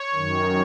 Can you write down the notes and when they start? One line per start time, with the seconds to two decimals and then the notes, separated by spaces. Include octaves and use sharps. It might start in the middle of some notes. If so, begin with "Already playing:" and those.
Already playing: C#5
0.14 F#2 D#3